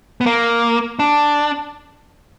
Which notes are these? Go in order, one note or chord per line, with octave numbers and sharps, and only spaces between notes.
B3
A#3
D4